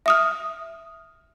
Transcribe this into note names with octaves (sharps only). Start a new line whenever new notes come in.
E5 D#6 F6